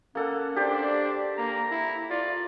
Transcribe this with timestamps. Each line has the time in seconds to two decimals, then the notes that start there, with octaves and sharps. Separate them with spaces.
0.15 A#3 C#4 A4 F#5
0.56 D4 G4 C5 D5
1.37 A#3 A#5
1.71 E4
2.10 F4 D5